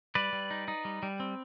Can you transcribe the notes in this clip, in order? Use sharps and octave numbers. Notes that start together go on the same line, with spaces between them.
G3 B4 D5
G3
D#4
D#4
G3
G3
C4